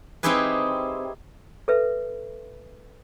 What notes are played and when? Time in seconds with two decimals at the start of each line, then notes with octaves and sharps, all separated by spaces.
0.23 C4 D#4 E4 G4 G#4 B4
1.68 A4 B4 E5